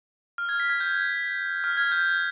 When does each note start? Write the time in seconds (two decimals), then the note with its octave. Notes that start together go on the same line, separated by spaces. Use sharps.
0.38 F6
0.49 G#6
0.60 B6
0.69 G#6
0.80 G6
1.64 F6
1.77 G#6
1.92 G6